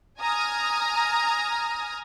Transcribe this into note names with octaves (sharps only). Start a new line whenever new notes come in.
G#5 A#5 D#6 F6